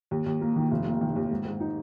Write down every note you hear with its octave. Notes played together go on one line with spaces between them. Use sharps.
D#2
D#2
A#3
D#3
F1
A#3
D#3
D#2
G#2
G#2
D#4